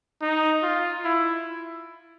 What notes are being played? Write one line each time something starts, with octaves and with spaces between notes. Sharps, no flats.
D#4
F4
E4